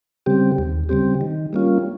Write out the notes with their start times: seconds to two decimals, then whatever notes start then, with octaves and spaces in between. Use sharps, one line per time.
0.26 C#3 G3 C4 G4
0.58 D#2
0.89 C#3 G3 C4 G4
1.21 D#3
1.53 G3 A#3 C#4 F4